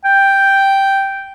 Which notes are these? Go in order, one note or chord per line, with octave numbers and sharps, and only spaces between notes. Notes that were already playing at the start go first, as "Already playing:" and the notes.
G5